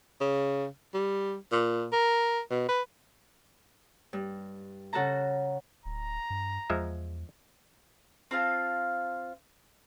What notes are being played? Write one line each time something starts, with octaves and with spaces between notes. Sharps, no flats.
C#3
G3
A#2
A#4
B2
B4
G2
C#3 F#4 A4 A5 A#5
D1 A#5
G2
E2 F3 G#3 E5
C4 F4 F5 A5